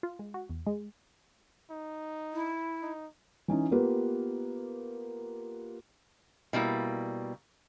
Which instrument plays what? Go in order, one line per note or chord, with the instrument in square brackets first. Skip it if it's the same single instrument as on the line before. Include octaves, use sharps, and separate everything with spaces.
[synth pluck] F4
G#3
F#4
E2
G#3
[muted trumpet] D#4
[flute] E4
[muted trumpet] D#4
[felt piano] E3 C#4 D#4
A#3 B3 F4 G4 B4
[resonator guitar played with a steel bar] B2 G3 A#3 E4